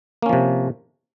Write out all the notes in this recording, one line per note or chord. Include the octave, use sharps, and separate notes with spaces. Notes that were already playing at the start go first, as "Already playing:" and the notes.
C3 F3 A#3 C#4